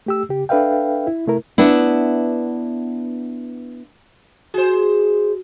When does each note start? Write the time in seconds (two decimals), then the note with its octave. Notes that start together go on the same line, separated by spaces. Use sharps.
0.06 A3 G4 E6
0.29 C#3 G4
0.49 D4 A4 B4 E5 F5 G5
1.07 E4
1.27 C3 A3 E4 A#4
1.58 B3 D4 E4
4.54 F#4 G#4 C5